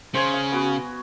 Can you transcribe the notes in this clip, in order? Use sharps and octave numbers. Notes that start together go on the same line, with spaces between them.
C#3 C5 G#5
F5
B3 F#4